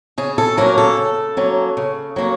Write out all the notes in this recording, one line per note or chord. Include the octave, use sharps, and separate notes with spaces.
C#3 G#4
A4
F#3 A#3 C#4 A#4
A4
C#3
F#3 A#3 C#4
C#3
F#3 A#3 C#4